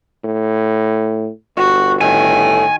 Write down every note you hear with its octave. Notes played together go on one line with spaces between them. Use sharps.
A2
G1 F#4
A2 D#3 G#5